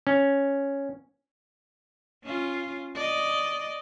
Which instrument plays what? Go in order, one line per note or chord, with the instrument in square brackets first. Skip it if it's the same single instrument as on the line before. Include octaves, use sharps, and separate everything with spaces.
[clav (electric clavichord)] C#4
[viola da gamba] C#4 F4
D5 D#5